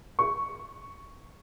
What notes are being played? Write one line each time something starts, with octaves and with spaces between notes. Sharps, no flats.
C#6